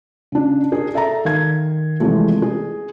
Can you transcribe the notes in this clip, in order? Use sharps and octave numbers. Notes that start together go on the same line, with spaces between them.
C#3 D4
G#4 A#4
A4 E5 A5 A#5
D#3 F5 G#6
C3 E3 F3 G#3 A3
G#4